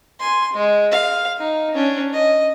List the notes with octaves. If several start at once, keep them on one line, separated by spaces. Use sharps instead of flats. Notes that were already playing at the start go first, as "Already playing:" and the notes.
G#5 C6
G#3
F5
D#4
C#4 D4
D#5